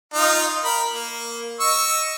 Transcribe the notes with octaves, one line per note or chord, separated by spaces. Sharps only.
D#4 F4
A#4 B5
A#3
D#5 C#6 E6